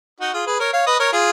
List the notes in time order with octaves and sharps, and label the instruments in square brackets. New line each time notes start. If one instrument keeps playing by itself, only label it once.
[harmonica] D#4 F#4
F4 G#4
G#4 B4
A#4 C#5
C#5 F5
B4 D#5
A#4 C#5
F4 G#4